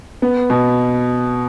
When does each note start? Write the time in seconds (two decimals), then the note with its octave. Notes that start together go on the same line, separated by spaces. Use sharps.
0.22 B3
0.50 B2